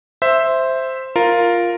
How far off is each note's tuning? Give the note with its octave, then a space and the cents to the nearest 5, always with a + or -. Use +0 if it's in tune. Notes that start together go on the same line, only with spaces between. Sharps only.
C5 +0 E5 +0
F4 +0 A#4 +0